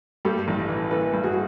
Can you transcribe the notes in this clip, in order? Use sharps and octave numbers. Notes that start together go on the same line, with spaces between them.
G2 G4 A4
A1
E3
E3 A4 B4
G2
F#4 G#4